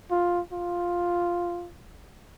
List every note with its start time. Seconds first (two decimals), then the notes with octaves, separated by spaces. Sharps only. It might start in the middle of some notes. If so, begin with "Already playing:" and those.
0.11 F4
0.52 F4